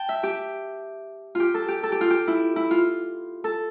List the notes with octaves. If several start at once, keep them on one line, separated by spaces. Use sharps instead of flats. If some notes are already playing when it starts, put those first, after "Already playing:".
Already playing: G5 A5
E5
G4
F4 G4
A4
G4
A4
G4
F4
G4
E4
E4
F4
A4